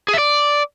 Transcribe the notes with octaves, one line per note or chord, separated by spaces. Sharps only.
G#4
E5
D5